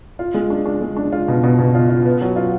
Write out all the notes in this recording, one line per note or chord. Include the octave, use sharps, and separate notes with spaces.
F4
G#3
D4
D4
G#3
D4
F4
B2
B2
B2
F4
F4
B3
F#3
F4